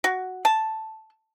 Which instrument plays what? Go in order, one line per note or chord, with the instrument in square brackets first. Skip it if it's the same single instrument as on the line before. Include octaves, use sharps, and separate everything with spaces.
[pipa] F#4
A5